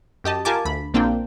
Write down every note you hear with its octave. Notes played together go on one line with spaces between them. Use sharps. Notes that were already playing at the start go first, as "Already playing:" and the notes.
F#2 G4 D#5 A5
F4 G4 A#4 G#5 A5 D6
D2 B5
A#1 A#3 C4 D4 F4 G5